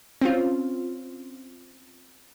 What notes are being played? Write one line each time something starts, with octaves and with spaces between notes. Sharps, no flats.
C4 C#4 F4